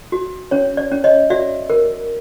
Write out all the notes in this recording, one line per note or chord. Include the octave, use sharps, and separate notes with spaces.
F#4
C#4 C#5
D5
C#4
C#5 D#5
F#4 D5 E5
A#4